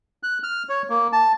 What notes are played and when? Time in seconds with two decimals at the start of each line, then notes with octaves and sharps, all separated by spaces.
0.23 F#6
0.43 F6
0.69 C#5
0.90 A#3
1.13 A5